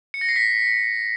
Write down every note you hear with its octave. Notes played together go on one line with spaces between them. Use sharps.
C#7
A#6
C7
B6